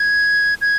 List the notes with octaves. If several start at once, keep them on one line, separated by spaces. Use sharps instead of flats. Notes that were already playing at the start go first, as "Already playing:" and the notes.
Already playing: G#6
G#6